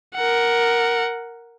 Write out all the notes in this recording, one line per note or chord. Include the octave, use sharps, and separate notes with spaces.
A#4 F#5